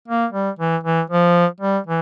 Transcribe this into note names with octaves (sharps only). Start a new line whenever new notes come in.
A#3
G3
E3
E3
F3
G3
E3